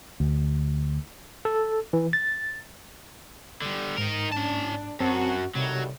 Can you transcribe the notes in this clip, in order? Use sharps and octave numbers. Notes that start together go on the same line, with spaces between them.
D2
A4
E3
A6
D3 G3
G#2 D#4 A#4
C#4 D4 A5
F#2 C4 F#4 A5
A2 C3 D#3 F#3 G3